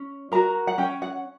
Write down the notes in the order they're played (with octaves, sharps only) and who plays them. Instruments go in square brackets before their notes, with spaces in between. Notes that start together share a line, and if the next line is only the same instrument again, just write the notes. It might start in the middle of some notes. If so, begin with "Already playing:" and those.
Already playing: [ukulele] C#4
F#4 A#4 A#5
F#5
C#4 G5
F#5